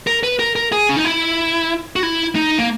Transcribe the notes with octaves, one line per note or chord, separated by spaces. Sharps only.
A#4
B4
A#4
A#4
G#4
C#4
D#4
E4
F#4
E4
D#4
A#3